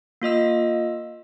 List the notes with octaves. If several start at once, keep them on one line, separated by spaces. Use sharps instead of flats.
A#3 F4 D#5 E6